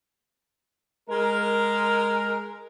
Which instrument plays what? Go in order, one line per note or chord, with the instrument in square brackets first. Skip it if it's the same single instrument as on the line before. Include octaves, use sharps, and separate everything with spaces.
[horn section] G#3 A#4